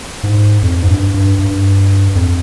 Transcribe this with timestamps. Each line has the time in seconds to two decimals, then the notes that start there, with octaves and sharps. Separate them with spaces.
0.23 G#2
0.62 F2
0.82 G#2
0.89 G2
1.14 G2
1.39 G2
2.15 F2